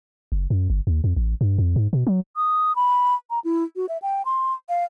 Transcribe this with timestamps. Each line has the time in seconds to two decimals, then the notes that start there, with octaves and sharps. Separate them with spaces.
0.32 F#1
0.50 F#2
0.70 G1
0.87 D#2
1.04 F2
1.17 A1
1.41 G2
1.58 F2
1.76 G#2
1.93 B2
2.07 F#3
2.36 D#6
2.76 B5
3.30 A#5
3.44 E4
3.76 F#4
3.89 E5
4.02 G5
4.25 C6
4.69 F5